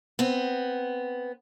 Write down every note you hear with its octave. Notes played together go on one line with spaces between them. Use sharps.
B3 C4